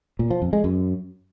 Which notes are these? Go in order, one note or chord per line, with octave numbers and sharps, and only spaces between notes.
A#2
F3
F2
G#3
F#2